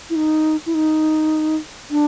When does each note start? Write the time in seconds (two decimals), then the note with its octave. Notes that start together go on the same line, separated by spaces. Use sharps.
0.10 E4
0.16 D#4
0.66 E4
0.74 D#4
1.90 D4